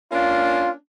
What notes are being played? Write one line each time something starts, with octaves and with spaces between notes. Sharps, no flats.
A#3 C#4 D4 F4